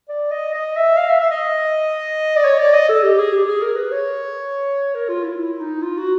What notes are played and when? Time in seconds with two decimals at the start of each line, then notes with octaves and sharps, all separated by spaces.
0.09 D5
0.31 D#5
0.54 D#5
0.76 E5
0.97 F5
1.09 E5
1.20 E5
1.31 D#5
2.36 D5
2.45 C#5
2.59 D5
2.73 D#5
2.89 A4
3.03 G4
3.18 G#4
3.33 G4
3.47 G#4
3.62 A#4
3.77 B4
3.92 C#5
4.95 A#4
5.09 F4
5.23 E4
5.38 E4
5.60 D#4
5.82 F4
5.97 F#4